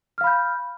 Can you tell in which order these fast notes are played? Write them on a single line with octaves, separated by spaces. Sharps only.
F6 F5 B5 G6